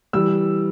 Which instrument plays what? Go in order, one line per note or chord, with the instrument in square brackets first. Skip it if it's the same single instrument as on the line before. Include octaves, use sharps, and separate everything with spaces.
[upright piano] E3 G3 E6